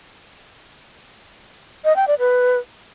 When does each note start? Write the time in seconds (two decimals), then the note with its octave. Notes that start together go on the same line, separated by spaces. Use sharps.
1.85 D#5
1.96 G5
2.08 D5
2.19 B4